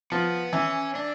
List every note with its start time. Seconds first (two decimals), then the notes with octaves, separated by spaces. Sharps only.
0.12 F3 B3
0.53 E3 C#4
0.95 D4